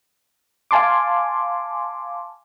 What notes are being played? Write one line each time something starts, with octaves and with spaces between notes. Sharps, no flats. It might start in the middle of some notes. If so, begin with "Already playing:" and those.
F5 G#5 A5 C6 D6